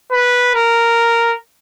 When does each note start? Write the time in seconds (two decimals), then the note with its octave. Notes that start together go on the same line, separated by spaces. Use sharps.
0.12 B4
0.55 A#4